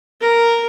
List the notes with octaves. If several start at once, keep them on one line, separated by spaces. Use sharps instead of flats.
A#4